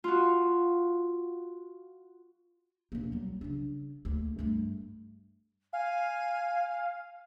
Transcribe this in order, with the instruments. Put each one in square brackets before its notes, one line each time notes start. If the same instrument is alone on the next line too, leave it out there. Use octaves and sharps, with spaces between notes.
[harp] F4 F#4
[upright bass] E1 A#3
F#3 G3
C#3 D4
D2 A#3
G2 A3
[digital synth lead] F5 [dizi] G#5